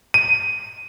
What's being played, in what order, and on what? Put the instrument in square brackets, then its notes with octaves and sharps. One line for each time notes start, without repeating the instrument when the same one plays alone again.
[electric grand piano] D#7